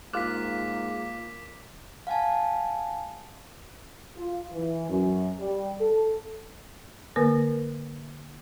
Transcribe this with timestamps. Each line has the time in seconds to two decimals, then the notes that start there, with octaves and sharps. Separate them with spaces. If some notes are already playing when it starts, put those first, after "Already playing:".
0.14 G#2 A#3 F4 D6 F6 F#6 B6
2.07 F5 F#5 G#5 A5
4.16 F4
4.52 E3
4.89 F#2
5.39 G3
5.81 A4
7.16 D3 A#3 A#4 B4